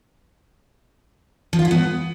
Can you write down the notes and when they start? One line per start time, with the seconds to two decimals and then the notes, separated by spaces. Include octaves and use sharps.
1.53 F3
1.59 F4
1.65 E4
1.71 B3